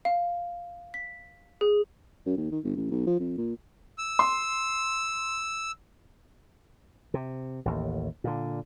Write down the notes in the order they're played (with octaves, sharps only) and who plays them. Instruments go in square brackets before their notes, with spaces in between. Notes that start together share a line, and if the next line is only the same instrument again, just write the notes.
[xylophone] F5
B6
G#4
[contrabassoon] F#2
D#2
D#3
G1
A1
B1
F3
F2
A#2
[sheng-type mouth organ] E6
[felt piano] C6
[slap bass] C3
A1 D#2
A#2 D3